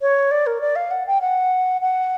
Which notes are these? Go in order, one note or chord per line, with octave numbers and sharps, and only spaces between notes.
C#5
D5
A#4
D5
F5
F#5
G5
F#5
F#5